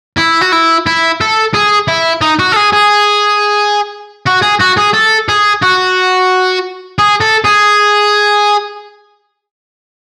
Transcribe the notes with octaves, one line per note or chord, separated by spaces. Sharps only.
E4
F#4
E4
E4
A4
G#4
E4
D#4
F#4
A4
G#4
G#4
F#4
G#4
F#4
G#4
A4
G#4
F#4
G#4
A4
G#4